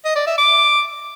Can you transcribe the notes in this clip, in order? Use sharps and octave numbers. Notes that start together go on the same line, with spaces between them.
D#5
D5
E5
D6